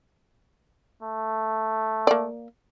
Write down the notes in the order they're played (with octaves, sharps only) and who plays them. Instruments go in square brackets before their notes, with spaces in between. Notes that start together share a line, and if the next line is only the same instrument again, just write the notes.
[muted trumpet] A3
[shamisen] A#3 D5